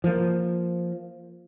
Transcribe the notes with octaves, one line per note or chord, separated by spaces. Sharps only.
F3 A#3